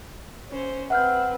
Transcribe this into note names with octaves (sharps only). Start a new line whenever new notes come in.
C#4 C5
C4 B4 E5 F#5 F6 G6